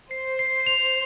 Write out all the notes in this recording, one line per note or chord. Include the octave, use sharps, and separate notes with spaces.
C5 C7
C7
F7